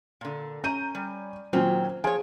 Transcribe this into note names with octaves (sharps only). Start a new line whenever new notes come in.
A#2 D3
C#4 A#5 G6 D#7
G3
A#2 D#3 F#3 C4 C#4
F3 G#4 C#5 G#5